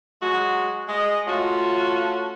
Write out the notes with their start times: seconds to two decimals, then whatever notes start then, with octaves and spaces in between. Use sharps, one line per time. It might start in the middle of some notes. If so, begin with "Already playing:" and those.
0.22 F#3 G#3 F#4
0.89 G#3 D#5
1.27 A3 C#4 F4 F#4